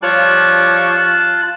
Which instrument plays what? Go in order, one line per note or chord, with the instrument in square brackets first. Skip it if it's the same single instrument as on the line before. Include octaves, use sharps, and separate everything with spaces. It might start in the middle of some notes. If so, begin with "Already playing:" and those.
[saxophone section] F3 G3 C#5 [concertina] F4 A5 F#6